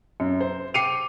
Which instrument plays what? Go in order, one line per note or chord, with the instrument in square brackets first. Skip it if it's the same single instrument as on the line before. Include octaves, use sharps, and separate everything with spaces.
[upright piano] F#2
C5
G5 D6 C7 C#7 D#7 F7